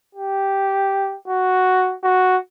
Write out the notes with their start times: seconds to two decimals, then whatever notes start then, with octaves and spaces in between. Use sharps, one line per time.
0.15 G4
1.28 F#4
2.03 F#4